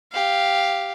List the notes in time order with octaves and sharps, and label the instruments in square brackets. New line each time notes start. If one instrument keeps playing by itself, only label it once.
[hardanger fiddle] G4 F5